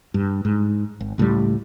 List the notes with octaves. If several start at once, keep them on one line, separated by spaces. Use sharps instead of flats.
G2
G#2
G#1
C#2 A2 D#3 G3